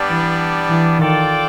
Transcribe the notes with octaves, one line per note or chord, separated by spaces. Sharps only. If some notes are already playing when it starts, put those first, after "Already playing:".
Already playing: G3 B3 D4
E3
E3
D#3 F4 A4 D5 G5